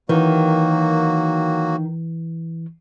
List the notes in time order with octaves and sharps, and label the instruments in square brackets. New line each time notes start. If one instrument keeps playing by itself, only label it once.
[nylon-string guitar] D#3 [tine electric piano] E3 [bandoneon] F#3 A#3 F#4